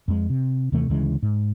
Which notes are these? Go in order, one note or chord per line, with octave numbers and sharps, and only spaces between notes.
F2 G#3
C3
D#2 C3 E3 A3
D2 C#3 E3 G#3
G#2